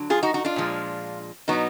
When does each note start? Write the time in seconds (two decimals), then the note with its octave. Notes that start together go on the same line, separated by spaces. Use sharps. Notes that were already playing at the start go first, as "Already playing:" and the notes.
Already playing: D3 F#3
0.10 F4 G#4
0.23 D#4 F#4
0.34 D#4 F#4
0.45 D4 F4
0.56 A#2 F3 G#3
1.48 B2 F#3 B3 D#4